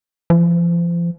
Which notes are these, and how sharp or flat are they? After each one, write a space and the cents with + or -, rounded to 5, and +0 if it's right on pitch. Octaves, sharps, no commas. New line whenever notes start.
F3 -35